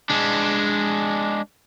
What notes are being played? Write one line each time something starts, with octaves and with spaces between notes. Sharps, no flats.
G#3 D4